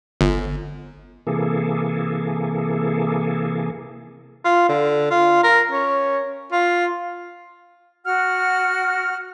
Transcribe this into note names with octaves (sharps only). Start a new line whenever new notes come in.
G1
C3 E3 A#3 G#4 A4
F4
D3
F4
A#4
C#4
F4
F#4 F#5 F6